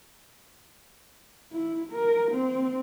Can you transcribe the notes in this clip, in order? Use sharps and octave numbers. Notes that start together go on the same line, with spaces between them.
E4
A#4
C4